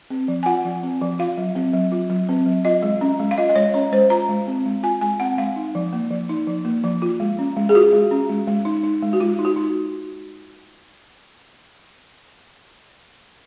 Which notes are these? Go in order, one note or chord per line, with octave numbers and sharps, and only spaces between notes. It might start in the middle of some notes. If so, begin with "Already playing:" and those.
C4
F3
G#5
F4 F#5
F3
C4
F3
F4 F5
F#3
C4
F#3
F4
F#3
C4
F#3
F4 D#5
G#3
C#4
G#3
F5
F4 D#5
D#5
G#3 C#5
C#4 C#5
G#3 C5
F4 A#5
G#3
C4
G#3
F4 G#5
G#3 G#5
C4 F#5
G#3 F5
D#4
F3
A#3
F3
D#4
F3
A#3
F3
F4
G#3
C#4
G#3
G#4
F4 F#4
G#3
C#4
G#3
G#3
D#4
D#4
G#3
F#4
G#3 F4
D#4
F#4
D#4